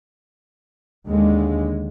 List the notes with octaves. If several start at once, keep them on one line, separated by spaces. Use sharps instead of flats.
D#2 D3 G#3